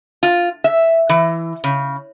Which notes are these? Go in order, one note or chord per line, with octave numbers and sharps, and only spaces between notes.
F4
E5
E3
C#3